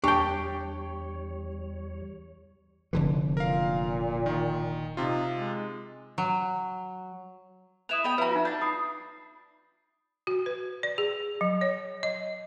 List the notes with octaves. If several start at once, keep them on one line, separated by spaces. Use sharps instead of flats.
E2 G3 D4 G4 C#5 G5 C#6
F1 D3 E3
A#2 A#4 F5
D#3
C3 D#4 F4
G#3
F#3
E4 B4 D#6 E7 F7
B3 D#5 G5 B5
E4 F#4 B4 A#5
D#4 F4
D4 A5 G6
B5 D#6 C7
F#4
B4
D5
G#4
F#3
C#5
D#5